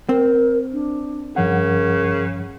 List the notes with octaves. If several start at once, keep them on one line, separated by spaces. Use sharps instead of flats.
C4 A#4
D4
G2 C#3 F3 A#4 F#5